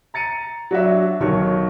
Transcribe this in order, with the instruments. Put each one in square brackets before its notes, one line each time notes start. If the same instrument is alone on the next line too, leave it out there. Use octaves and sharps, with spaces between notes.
[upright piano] A#5 A6 C#7 D#7
F#3 D4 F#4 E5
B1 D#3 F#3 C#5 C#6